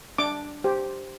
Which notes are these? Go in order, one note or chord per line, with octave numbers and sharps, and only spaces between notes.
D4 D6
G4 C5